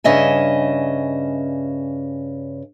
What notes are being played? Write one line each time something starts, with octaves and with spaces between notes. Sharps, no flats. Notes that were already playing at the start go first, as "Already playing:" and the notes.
G2 C#3 D#5 E5 G#5